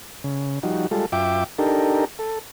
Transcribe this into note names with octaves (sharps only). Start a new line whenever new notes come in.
C#3
F3 G3 D#4 F#4
G3 G#3 F4 A4
F#2 F4 E5 G5 D6
D4 D#4 G4 A4 A#4
A4